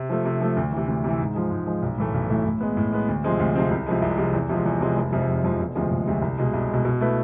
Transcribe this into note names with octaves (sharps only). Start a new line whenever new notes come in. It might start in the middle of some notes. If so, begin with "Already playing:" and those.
Already playing: C3
F3 A3
C3
F3 A3
D2
C3 E3
D2
C3 E3
G#2
F3 G#3
G#2
F3 G#3
B1
A2 E3 A3
B1
A2 E3 A3
A2
G#3 B3
A2
G#3 B3
D2
C3 F3 G#3 C4
D2
C3 F3 G#3 C4
C2
C3 F3 G#3
C2
C3 F3 G#3
E2
C3 F3 G#3
E2
C3 F3 G#3
F1
F2 C3 F3 G#3
F1
F2 C3 F3 G#3
E1
D2 C3 F3 G#3
E1
D2 C3 F3 G#3
C2
B2 G#3
C2
B2 G#3
B2
A3 E4 B4